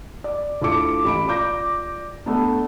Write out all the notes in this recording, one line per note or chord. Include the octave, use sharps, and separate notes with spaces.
D5
D2 E4 F4 A4 D6 C#7
A1 B5 D7
F4 D5 D6 G6 A#6
A3 B3 D4